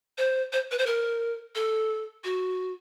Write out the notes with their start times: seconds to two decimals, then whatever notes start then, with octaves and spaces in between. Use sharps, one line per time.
0.18 C5
0.52 C5
0.71 B4
0.78 C5
0.86 A#4
1.55 A4
2.24 F#4